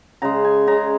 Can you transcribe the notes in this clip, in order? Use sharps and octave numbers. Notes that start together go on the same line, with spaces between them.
C#3 G#3 A#5
G#5
C#3 G#3 A#5